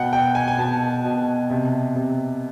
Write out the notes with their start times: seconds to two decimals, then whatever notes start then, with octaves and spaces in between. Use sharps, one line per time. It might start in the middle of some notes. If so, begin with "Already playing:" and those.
Already playing: B2 F#5 G5
0.13 B2 G5
0.35 G#5
0.48 G#5
0.58 B2 A5
1.05 B2
1.50 C3
1.96 C3